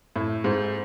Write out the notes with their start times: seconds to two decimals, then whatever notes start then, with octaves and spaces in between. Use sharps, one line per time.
0.16 A2
0.44 G#2